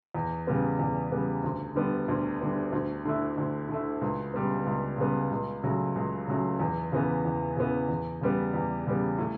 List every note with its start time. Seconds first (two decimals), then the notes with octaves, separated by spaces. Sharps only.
0.14 E2
0.47 C#3 G3 B3
0.79 E2
1.11 C#3 G3 B3
1.44 D2
1.75 D3 G3 B3
2.08 D2
2.41 D3 G3 B3
2.72 D2
3.05 D3 A3 E4
3.38 D2
3.69 D3 A3 E4
4.01 C#2
4.34 C#3 G3 B3
4.66 C#2
4.98 C#3 G3 B3
5.31 C#2
5.63 C#3 F#3 A3
5.96 C#2
6.28 C#3 F#3 A3
6.59 E2
6.92 C#3 E3 B3
7.25 E2
7.56 C#3 E3 B3
7.89 E2
8.21 C#3 G3 B3
8.54 E2
8.87 C#3 G3 B3
9.18 A2